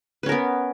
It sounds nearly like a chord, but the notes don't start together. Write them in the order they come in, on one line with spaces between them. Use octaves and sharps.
B4 C#4 A#4 B3